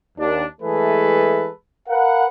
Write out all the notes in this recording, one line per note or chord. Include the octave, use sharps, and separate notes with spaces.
D#2 D4
E3 G#3 A3 G#4 A4 B4
A#4 B4 F5 F#5